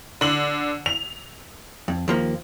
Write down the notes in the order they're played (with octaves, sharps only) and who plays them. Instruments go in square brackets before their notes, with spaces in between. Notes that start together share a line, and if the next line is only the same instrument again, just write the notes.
[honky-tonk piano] D3 F#7
F7
[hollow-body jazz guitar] F2
D#2 F3 A#3